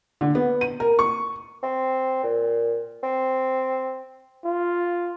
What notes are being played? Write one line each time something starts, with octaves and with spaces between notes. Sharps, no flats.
D3
B3
D#7
A#4
C#6
C4
A#2
C4
F4